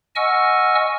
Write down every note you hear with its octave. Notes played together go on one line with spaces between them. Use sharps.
D#5 F#5 G#5 C#6 E6 F6